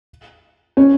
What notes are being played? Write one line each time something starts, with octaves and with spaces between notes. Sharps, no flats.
C#4